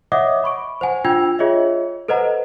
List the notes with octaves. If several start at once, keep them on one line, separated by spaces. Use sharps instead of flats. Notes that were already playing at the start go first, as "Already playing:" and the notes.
C#5 D#5 E5 F#5 D6 D#6
B5 C#6 D7
C5 F#5 G#5
D4 F4 G5 E6 G#6 F7
F4 G#4 C#5 D#5 E5
A4 B4 C5 D#5 F#5 A#5